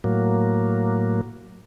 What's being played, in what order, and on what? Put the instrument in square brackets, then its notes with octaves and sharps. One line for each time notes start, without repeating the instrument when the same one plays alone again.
[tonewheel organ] A2 F#3 A#3